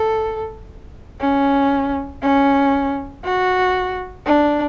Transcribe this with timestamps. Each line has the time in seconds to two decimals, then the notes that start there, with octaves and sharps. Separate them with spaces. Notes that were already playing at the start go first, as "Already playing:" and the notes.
Already playing: A4
1.21 C#4
2.22 C#4
3.24 F#4
4.26 D4